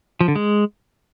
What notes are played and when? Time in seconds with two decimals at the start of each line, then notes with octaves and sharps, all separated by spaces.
0.21 F3
0.28 D3
0.36 G#3